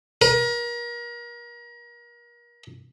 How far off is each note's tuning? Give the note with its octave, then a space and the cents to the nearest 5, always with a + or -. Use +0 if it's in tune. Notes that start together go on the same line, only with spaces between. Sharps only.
A#4 +35